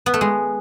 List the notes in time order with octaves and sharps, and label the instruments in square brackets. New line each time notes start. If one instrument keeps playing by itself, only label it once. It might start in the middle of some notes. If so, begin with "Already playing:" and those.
[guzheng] B3
A3
G#3